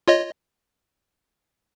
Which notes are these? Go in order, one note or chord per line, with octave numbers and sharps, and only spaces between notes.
F4 C#5 D#5